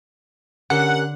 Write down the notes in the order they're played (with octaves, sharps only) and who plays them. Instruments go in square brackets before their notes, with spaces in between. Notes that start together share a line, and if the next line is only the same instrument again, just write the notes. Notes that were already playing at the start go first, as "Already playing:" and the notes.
[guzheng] D3 [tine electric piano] C#4 G4 A#4 [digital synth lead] F#5